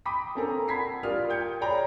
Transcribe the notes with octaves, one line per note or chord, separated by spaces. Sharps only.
G5 B5 D6 D#6 B6
A#3 C4 A4 G#5 A#5
F#5 A5 B5 G#6 B6 C7
F4 G4 A#4 D5 D#6 F6
G5 G6 G#6 C#7
G#4 C#5 D5 G5 A#5 B5